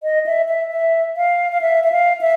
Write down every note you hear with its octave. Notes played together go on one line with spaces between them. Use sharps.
D#5
E5
E5
E5
F5
F5
E5
E5
F5
E5